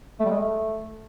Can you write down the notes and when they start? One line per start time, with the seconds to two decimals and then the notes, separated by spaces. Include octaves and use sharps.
0.20 A3
0.25 G3
0.31 G#3
0.36 A3